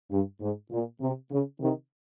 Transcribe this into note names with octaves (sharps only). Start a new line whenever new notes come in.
G2
G#2
A#2
C3
C#3
C3 D#3